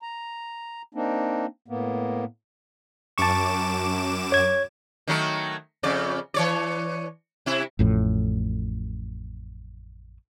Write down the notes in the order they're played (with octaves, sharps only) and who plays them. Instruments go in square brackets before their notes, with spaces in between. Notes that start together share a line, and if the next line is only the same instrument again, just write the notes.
[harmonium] A#5
A#3 C4 D4 D#4
A2 A#3 B3
[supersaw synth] F#2 D6 E7 [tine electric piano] A5 C#6
[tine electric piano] C#5 G#6
[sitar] D#3 F#3 A3
F2 C#3 D5
E3 C#5 D5
C3 E4
[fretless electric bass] A1 F2 A2